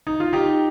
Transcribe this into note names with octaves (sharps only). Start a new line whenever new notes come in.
D#4
F4
D#4 G4